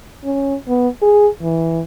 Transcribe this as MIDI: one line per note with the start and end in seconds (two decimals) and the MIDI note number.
0.24 0.55 61
0.68 0.89 59
1.02 1.28 68
1.42 1.82 52